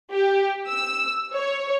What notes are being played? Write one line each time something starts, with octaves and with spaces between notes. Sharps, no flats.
G4
E6
C#5